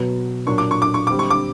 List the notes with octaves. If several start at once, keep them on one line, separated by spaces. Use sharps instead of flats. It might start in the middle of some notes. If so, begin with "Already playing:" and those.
Already playing: B2 F#3 B3
A#2 F#3 A#3 D4 C#6
D6
C#6
D6
C#6
D3 G3 C4 D6
C#6
D6